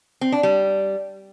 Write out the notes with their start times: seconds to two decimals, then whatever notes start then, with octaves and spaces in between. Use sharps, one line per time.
0.21 C4
0.32 D4
0.43 G3